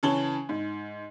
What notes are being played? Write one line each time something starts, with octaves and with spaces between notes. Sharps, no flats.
C#3 E3 C#5 A5 F#7 G7
G#2